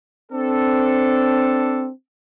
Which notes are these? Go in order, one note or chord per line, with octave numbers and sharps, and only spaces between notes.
C4 D4 A4